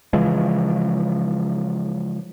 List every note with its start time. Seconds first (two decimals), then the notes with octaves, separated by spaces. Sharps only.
0.13 C#3 E3 F3 G#3